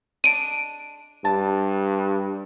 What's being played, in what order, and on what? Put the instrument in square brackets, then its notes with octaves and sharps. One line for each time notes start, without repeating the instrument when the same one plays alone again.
[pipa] G#3 D4 [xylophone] D7 D#7
[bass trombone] G2 [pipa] A5